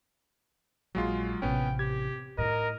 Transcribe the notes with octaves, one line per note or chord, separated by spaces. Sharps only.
A#1 F#3 G#3 F4
A1 C3 B3 C#4 G5
G4 G#6
A2 D#4 A#4 D#5